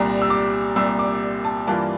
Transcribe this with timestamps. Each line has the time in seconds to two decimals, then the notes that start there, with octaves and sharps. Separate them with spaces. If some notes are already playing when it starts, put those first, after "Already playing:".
Already playing: C2 A#2 G3 A#5
0.22 E6
0.30 D6
0.76 C2 A#2 G3 E6
0.99 D6
1.45 A5
1.67 G2 E3 A#3 D4 F4 A5